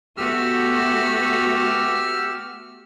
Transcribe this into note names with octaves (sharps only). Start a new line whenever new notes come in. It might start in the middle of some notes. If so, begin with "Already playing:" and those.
A3 B3 F#4 G4 E6 F6